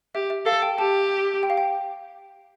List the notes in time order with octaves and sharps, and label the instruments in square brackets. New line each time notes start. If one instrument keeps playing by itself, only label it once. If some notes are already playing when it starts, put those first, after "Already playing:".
[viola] G4 [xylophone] E5
[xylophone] E5
[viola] A4 [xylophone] F5
[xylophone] G5
[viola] G4 [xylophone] A5
[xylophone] G5
F5
G5